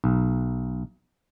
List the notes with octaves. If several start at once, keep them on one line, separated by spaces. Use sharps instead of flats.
B1